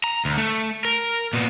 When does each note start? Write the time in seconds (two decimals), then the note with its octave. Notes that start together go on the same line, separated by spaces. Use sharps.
0.04 A#5
0.25 D2
0.37 A3
0.85 A#4
1.33 A#2 B3